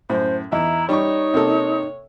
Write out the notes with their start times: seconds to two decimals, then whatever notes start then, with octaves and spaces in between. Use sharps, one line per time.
0.10 F#2 A2 C5
0.52 E2 D#4 E4 E5 A#5
0.89 G3 D#4 C#5 C#6
1.34 C3 A#3 A4